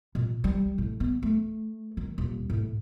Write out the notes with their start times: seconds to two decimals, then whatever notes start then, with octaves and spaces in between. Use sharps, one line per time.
0.15 A#2
0.44 G3
0.78 A2
1.00 B3
1.23 A3
1.97 D#3
2.18 D#1
2.50 A2